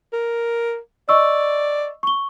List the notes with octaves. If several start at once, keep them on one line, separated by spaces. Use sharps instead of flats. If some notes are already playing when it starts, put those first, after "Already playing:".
A#4
D5 D#5 C#6 E6
C#6 G7